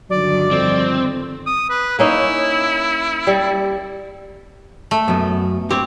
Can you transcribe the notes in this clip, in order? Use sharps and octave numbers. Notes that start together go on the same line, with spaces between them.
G2 D3 D#3 F#3 D5
F2 C4
D#6
B4
A#3 C#4 D#4 E4
G3
A3
F#2 B2
C4 G4 C#5